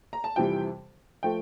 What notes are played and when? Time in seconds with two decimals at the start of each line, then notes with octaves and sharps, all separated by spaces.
0.13 A#5
0.24 A5
0.36 F2 C3 E3 G3 G5
1.23 F3 A3 G5